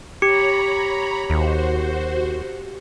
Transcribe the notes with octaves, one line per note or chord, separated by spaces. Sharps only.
G4 C#5 A#5 B5 C#7
D#2 F#4 C5